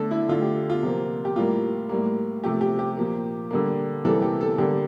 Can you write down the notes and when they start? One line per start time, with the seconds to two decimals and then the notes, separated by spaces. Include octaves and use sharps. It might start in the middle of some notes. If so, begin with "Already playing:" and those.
Already playing: D3 A3 A4
0.11 E4
0.29 D3 A3 F4
0.42 G4
0.70 F4
0.83 C3 F3 A#3
1.25 G4
1.36 A2 G3 A#3 F4
1.89 A2 G3 A#3
2.44 C3 F3 A3 G4
2.61 G4
2.79 G4
2.97 A#2 F3 A#3
3.51 D3 G3 A#3
4.05 C3 E3 G3 A#3 A4
4.22 G4
4.41 A4
4.58 D3 G3 A#3 G4